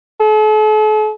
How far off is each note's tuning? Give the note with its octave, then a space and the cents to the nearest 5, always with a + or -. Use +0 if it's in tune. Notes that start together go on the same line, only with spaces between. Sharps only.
A4 -45